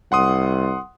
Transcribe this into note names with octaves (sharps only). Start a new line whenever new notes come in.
C2 F#5 C6 D#6